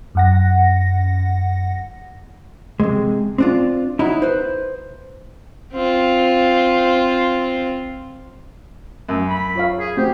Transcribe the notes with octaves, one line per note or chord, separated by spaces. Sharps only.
F#2 F#5 A#6
C3 G#3
C4 D4 F4
D#4 E4 F#4 C#5
B4 C5
C4 F4
F#2
B5
F4 C#5 F5
G#4
A3 C4 F#4 G4